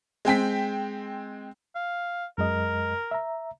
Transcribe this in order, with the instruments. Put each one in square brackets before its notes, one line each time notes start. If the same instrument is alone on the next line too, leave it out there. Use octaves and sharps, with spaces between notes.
[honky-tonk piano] G#3 C4 G5 B6
[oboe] F5
[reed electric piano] F#2 G#3 D#5 [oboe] A#4
[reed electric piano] E5 A#5